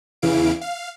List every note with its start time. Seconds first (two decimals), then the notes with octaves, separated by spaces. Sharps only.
0.22 E2 C#3 E3 E4 F5 D7
0.61 F5